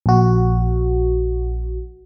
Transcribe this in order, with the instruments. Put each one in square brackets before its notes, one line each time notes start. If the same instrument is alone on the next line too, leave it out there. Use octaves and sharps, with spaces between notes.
[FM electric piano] A#1 F#4